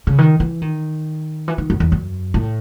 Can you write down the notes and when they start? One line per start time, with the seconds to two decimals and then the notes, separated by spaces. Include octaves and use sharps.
0.07 C#3
0.18 D#3
0.40 E3
0.62 D#3
1.48 E3
1.58 D#3
1.70 F#2
1.80 E2
1.92 F#2
2.34 A2